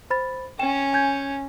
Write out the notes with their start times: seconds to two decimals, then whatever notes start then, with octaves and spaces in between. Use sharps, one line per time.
0.10 C5 B5 A6
0.59 C#4 G5 E7
0.93 G#5 G6 G#6